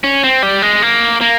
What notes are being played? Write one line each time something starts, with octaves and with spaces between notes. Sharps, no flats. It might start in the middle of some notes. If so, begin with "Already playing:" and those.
C#4
C4
G3
G#3
A#3
A#3